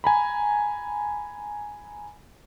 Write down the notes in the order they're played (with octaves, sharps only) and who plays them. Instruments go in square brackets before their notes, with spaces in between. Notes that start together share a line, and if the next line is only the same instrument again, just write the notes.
[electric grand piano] G#5 A#5 B5